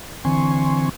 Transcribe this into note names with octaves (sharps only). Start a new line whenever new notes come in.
D3 E3 C4 G#5 C6 C#6